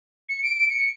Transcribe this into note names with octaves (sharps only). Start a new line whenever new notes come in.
C#7
D7
D7
C#7